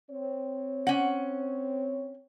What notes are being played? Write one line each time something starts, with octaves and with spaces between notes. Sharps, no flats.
C4 C#5
C#4 F#5